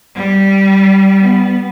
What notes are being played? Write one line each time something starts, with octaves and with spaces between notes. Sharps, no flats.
G3
B3